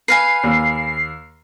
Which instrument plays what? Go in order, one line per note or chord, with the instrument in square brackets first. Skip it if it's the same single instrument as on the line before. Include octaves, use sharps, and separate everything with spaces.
[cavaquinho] B4 F5 G#5 [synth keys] C7
[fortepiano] D#2